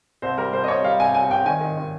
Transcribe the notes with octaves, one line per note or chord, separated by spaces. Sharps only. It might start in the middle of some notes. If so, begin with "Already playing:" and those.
C2 C5
G3 A#4
C2 C5
D#5
C2 C#5
G3 F5
C2 G#5
C2 G#5
C2 G5
D#3 G#5
D#3
D#3